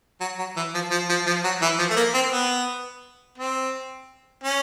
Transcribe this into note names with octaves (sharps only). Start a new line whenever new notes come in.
F#3
F#3
E3
F3
F3
F3
F3
F#3
E3
F3
A3
A#3
C4
B3
C4
C#4